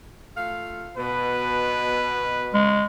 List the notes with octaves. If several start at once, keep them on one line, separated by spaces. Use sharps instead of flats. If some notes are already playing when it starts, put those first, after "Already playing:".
A3 F4 F5
B2 B4
G#3